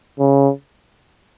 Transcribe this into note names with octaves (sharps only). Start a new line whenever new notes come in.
C#3